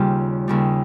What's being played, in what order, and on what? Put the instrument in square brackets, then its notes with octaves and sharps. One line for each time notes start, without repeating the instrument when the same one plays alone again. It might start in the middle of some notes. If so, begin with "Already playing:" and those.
Already playing: [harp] D#2 C#3 G3 F4 G4
D#2 C#3 G3